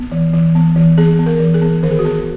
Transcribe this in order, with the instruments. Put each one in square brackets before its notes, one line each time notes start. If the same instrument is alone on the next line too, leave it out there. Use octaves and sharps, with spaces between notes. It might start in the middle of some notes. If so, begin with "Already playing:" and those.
Already playing: [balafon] B3
E3
E3
B3
E3
B3 G#4
B3
A#4
E3
G#4
B3
D#3 A#4
G#4
F#4
B3 G#4